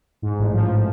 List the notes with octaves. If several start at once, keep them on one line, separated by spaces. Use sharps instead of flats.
G#2
A1
F3